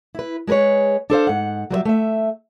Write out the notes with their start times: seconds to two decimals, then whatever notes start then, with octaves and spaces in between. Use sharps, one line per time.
0.15 E4 B4
0.47 G#3 G#4 A#4 B4 C#5
1.10 D4 A4 C5 F5
1.27 G#2 F#5
1.71 F#3 G3 C5 E5
1.85 A3 E5